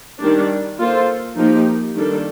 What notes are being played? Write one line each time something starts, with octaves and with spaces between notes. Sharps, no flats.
D#3 G3 D4
A#3 F4 A4 C5
F3 A#3 D#4 G4
D#3 G3 A#3 D4 A4